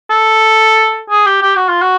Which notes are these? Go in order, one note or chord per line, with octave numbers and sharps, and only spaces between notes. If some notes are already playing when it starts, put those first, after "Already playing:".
A4
G#4
G4
G4
F#4
F4
F#4